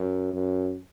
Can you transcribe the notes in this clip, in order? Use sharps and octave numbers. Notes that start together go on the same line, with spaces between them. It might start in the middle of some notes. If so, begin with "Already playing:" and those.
Already playing: F#2
F#2